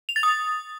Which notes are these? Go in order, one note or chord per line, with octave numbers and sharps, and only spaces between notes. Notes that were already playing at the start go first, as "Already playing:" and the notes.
F7
A6
D#6